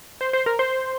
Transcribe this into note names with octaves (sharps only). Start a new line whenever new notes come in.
C5
C5
A#4
C5